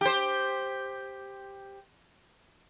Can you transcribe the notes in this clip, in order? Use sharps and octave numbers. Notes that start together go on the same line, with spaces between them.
G4 C5